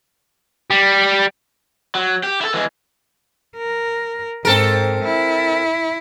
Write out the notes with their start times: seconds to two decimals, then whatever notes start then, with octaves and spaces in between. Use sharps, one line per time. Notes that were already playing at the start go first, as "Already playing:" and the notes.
0.70 G3
1.95 F#3
2.24 G4
2.41 E4 A4
2.54 E3 G#3
3.57 A#4
4.45 G#2 C4 A4 A#4
5.04 E4